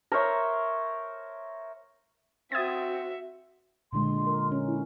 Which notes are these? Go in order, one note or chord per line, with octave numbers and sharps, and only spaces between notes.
A#4 C5 C#5 E5
C4 F#4 E5 D#6 G#6 A6
A#2 D3 G#3 C6
A#4
C#4
E4